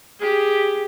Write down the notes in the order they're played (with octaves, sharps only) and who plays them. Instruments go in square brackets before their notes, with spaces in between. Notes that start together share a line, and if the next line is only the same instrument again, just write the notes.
[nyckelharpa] G4 G#4